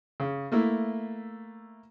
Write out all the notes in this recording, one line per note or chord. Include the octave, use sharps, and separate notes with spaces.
C#3
A3 A#3 E4